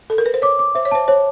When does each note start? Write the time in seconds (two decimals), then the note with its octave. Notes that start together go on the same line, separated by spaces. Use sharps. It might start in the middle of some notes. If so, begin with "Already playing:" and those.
0.10 A4
0.18 A#4
0.26 B4
0.34 C5
0.42 C#5 D6
0.59 D6
0.75 C5 E5
0.85 C#5
0.91 C5 A5
1.08 C5 C#5